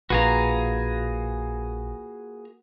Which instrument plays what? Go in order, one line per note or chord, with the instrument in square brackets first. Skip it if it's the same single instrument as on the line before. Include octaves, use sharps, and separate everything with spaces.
[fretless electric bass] A#1 [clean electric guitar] A#3 F4 B4 [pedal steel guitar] F#4 G#4 A#5